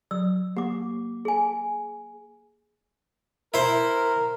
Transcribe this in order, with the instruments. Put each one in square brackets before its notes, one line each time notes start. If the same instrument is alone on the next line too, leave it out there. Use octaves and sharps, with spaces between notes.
[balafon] F#3 [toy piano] E6
[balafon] A#3 [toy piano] G4 D6
[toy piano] G#4 G#5
[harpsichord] E4 C5 [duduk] A#4